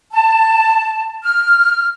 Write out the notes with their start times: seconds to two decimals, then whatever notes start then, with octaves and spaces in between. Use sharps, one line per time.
0.12 A5
1.23 F6